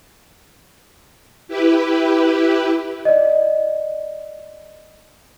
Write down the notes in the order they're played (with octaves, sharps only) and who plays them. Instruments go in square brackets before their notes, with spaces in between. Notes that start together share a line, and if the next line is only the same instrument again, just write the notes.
[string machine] E4 G4 B4
[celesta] D5 D#5